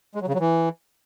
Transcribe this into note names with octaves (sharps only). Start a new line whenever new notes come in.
G#3
F#3
C#3
F#3
E3